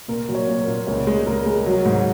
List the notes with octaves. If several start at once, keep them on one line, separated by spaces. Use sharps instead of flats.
A#2 A#4
F#3
C#5
A#2
A#4
A#2
C#2 C#5
G#3
G#3 A#4
G#3
F#3
G#2